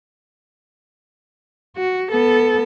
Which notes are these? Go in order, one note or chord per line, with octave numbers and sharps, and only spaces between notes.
F#4
B3 A4